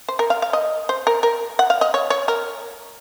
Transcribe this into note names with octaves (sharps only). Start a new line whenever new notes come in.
C5
A#4
F5
F5
D#5
C5
A#4
A#4
F#5
F5
D#5
C#5
C#5
A#4